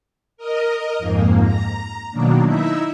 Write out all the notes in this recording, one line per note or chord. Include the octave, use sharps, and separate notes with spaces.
A#4 D#5
F2 G#2 A#3
A#5
B2 D#3 F#3 A#3 D4
D#4 E4 E5